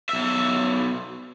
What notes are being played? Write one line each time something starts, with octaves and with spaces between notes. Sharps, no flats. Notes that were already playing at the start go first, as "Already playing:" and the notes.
B1 E5